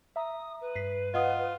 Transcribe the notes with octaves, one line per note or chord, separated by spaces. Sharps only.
E5 A#5 D#6
B4
G2 B6 C7
F4 D#5 F#5 D#6